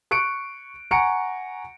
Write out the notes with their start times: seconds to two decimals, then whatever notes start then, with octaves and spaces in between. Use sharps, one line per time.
0.11 C#6 F#6 C#7 D7
0.91 F#5 G#5 A#5 C#6 C#7 D7